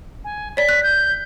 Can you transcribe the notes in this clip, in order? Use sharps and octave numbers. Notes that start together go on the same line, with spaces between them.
G#5
C#5 D5 B6
F#6
G6